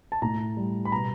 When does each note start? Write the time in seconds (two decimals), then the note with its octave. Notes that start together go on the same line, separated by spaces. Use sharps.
0.12 A5
0.22 A2 A#5
0.57 G3
0.85 B5
0.91 B2 A#5